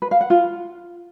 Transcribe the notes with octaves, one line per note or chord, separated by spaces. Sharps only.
B4
F5
F#5
F4